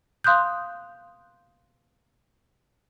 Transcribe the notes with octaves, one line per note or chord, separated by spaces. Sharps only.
F5 C6 D#6 F#6 G6